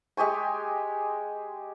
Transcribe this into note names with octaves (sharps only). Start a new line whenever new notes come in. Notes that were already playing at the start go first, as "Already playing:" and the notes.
G#3 G4 G#5 C#6